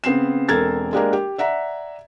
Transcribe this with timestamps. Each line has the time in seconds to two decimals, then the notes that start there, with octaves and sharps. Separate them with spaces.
0.04 C#3 B3 C4 C7 E7
0.49 E1 C4 A4 A#4 G#6 A6
0.93 G#3 A#3 D4 G4 G#4 A#4
1.13 G4
1.38 D5 E5 F#5 A#5